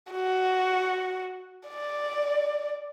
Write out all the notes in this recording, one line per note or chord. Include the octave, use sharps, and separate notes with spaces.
F#4
D5